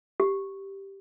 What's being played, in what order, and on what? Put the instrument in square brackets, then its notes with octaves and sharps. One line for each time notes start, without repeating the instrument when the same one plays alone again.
[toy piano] G4